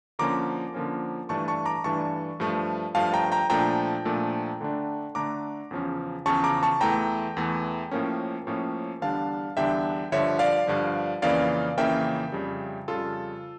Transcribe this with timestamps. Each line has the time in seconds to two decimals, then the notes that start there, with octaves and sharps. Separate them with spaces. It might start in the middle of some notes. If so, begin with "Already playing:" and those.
0.19 D3 F3 A#3 C#4 A#5 D6
0.74 D3 F3 A#3 C#4
1.29 G2 E3 A3 D4 A5 C#6
1.48 A5 C#6
1.66 A#5 D6
1.84 G2 E3 A3 D4 A5 C#6
2.40 G2 F3 A3
2.95 G2 F3 A3 F5 A5
3.14 G5 A#5
3.32 G5 A#5
3.50 A#2 F3 A3 D4 G5 A#5
4.05 A#2 F3 A3 D4
4.61 D3 A3 D4
5.15 D3 A3 D4 A#5 D6
5.71 E2 C#3 F3 C#4
6.26 E2 C#3 F3 C#4 A5 C#6
6.44 A#5 D6
6.63 A5 C#6
6.81 E2 E3 A3 G5 A#5
7.37 E2 E3 A3
7.91 A2 F3 A#3 C#4
8.47 A2 F3 A#3 C#4
9.01 E2 D3 G3 D4 F5 A5
9.57 E2 D3 G3 D4 E5 G5
10.12 G2 D3 F3 C#5 E5
10.39 D5 F5
10.67 G2 D3 F3
11.22 F2 C#3 E3 A#3 C#4 D5 F5
11.77 F2 C#3 E3 A#3 C#4 E5 G5
12.32 F2 C#3 G3
12.88 F2 C#3 G3 F4 A4